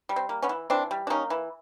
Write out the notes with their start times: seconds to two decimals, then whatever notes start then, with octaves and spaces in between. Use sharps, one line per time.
0.09 G3
0.16 C4
0.29 A#3
0.42 B3 C#4
0.49 E3
0.70 E3 C4 D4
0.91 G3
1.07 D4
1.10 A#3 C#4 D#4
1.30 E3